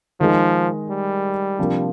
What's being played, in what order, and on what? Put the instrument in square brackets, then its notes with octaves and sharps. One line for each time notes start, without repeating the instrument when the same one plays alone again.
[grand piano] D#3 G#3 D#4 [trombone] F3
[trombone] G3
[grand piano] C3 F3 A#3 D4